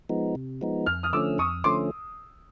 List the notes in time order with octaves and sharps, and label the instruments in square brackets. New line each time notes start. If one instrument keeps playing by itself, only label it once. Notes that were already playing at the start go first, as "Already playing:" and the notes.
[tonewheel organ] F3 G#3 B3 D#4
C3
F3 G#3 B3 D#4
[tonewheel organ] F2 [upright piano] F6
[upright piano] D#6 F6
[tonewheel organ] D3 F3 A3 C#4 [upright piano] D6 E6
[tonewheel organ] F2 [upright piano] C#6 D#6
[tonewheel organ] D3 F3 A3 C#4 [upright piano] C6 D6